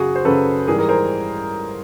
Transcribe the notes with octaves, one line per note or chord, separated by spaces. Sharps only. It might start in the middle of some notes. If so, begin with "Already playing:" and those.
Already playing: F#2 C#3 F#3 F#4 G#4
C5
F#2 C#3 F#3 A4 B4
G#2 E3 G3 G#4 A#4
G#4 A#4
A#4 C5